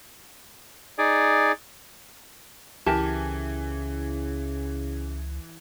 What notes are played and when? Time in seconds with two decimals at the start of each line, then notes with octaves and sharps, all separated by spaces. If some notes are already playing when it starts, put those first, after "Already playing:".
0.98 D#4 G#4 D5
2.86 C#2 C#3 E3 G4 A#4 G#5 A5